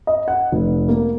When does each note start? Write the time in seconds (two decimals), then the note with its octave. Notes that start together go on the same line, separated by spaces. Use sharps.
0.07 D#5
0.28 F#5
0.52 F1
0.88 A#3